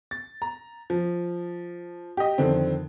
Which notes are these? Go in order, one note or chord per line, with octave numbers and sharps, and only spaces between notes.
A6
A#5
F3
G4 D#5
F2 D3 D#3 C4